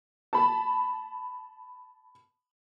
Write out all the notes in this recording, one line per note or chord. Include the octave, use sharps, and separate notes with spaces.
A5 B5